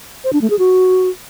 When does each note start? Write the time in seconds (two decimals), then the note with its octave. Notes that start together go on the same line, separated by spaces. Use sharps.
0.24 C5
0.33 D4
0.42 A3
0.50 G#4
0.59 F#4